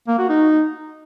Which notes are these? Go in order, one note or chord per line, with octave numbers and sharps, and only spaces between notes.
A#3
F#4
D#4